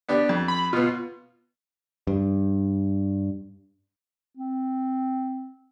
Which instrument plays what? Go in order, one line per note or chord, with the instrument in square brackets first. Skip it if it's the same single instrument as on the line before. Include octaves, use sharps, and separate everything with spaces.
[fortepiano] B3 D4 G4
F2
[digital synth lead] B5
[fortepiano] B2 B3 [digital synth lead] F4
[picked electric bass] G2
[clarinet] C4